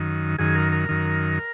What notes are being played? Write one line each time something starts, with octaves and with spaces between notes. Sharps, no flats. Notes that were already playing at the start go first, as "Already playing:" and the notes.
Already playing: F#2 D#3
F#2 D#3 G#4
A#4
A#4
F#2 D#3